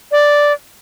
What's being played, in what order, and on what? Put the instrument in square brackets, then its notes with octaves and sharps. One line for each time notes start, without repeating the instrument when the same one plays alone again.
[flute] D5